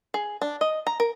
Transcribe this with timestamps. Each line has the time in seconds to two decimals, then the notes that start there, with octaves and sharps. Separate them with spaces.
0.14 G#4
0.42 D4
0.61 D#5
0.87 A#5
1.00 A#4